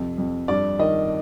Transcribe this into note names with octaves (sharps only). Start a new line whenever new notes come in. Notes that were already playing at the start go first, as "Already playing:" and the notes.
Already playing: F2 C3
F2
G2 D5
D#3 D#5